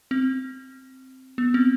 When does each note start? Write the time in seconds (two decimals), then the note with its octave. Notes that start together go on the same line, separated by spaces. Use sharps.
0.11 C4
1.38 B3
1.54 C4